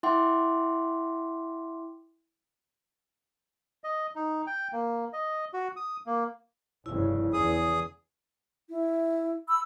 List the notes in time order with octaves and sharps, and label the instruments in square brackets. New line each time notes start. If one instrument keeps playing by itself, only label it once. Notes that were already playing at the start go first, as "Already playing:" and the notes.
[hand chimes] E4 E5 F#5 G5 C6 D6
[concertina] D#5
D#4
G5
A#3
D#5
F#4
D#6
A#3
[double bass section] F1 G2 C#3 [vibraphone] E4
[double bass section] E2 [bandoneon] G#4 D#6
[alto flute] E4
[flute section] B5 E6